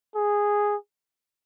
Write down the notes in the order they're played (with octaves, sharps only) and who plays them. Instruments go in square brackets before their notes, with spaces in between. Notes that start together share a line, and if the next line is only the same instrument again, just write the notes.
[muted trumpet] G#4